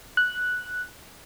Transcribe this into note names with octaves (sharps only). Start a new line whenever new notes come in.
F#6